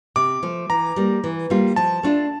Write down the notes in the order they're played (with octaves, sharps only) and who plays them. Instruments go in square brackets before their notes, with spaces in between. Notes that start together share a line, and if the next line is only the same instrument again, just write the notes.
[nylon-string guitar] C3 [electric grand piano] D6
[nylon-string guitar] F3 A3
[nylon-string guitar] E3 [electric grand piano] A#5
[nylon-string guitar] G3 A#3
E3
G3 A#3 F4
[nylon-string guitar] F3 [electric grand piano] A5
[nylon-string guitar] A3 D4 F4